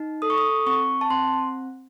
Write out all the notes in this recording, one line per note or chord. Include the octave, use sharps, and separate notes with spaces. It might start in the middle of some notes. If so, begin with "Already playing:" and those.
Already playing: D#4
A4 D#6
C#6
D#6
C4 C#6
A5
C4 C6